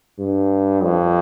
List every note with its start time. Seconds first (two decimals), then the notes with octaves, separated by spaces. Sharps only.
0.19 G2
0.83 F2